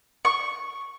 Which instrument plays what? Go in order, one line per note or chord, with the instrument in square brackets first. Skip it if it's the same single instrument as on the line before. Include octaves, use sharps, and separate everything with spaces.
[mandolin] C#6